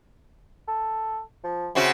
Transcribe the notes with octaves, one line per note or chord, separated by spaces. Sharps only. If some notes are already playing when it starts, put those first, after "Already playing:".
A4
F3
C#3 C4 E4 F#4